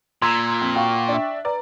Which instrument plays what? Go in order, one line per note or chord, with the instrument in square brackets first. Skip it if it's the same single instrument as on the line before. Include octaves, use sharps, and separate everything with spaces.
[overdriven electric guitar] A#2 [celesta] A#5 E6 G#6 [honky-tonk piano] C6
[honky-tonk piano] F2
[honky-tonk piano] F#4 F5 [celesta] G5 C#6
[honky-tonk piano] D4 E5
[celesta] B4 A#5 [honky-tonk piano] D5